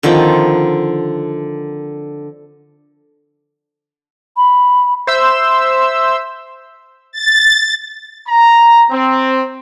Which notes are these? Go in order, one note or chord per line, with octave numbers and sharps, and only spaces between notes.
D3 D#3 F3 C4
B5
C5 E5 E6 G6
A6
A#5
C4